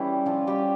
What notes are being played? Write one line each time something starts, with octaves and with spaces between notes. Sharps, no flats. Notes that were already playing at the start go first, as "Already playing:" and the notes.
Already playing: E3 G3 C#4 E4 G4
F3 F4
G3 G4